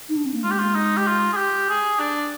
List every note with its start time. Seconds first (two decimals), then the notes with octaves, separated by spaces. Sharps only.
0.09 D#4
0.17 D4
0.26 C4
0.34 A#3
0.43 G#3 F4
0.50 G4
0.59 F4
0.75 D#4
0.97 G4
1.06 F4
1.33 G#4
1.37 G4
1.69 G#4
1.99 D4